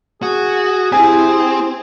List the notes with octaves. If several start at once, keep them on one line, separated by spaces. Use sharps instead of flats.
F#4 G#4
C4 E4 G4 G#4 G#5